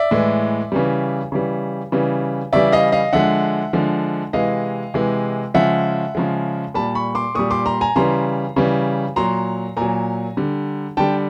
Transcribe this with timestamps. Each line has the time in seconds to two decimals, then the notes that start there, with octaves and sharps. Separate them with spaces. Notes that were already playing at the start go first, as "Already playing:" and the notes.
Already playing: D5 E5
0.11 A2 E3 G#3
0.72 C#3 E3 G3
1.32 C#3 E3 G3
1.92 C#3 E3 G3
2.53 C#3 E3 G3 D5 E5
2.72 D#5 F5
2.92 D#5 F5
3.13 D3 F3 G#3 E5 F#5
3.73 D3 F3 G#3
4.33 C3 E3 G#3 D#5 F5
4.94 C3 E3 G#3
5.54 C#3 F3 G#3 E5 F#5
6.15 C#3 F3 G#3
6.74 A#2 G3 A5 B5
6.95 B5 C#6
7.15 C6 D6
7.35 A#2 G3 C#6 D#6
7.51 C6 D6
7.66 A#5 C6
7.81 G#5 A#5
7.96 C#3 E3 G3 A#5 C6
8.56 C#3 E3 G3
9.16 A#2 F#3 A#5 C6
9.77 A#2 F#3 G#5 A#5
10.37 D3 G3
10.97 D3 G3 G5 A5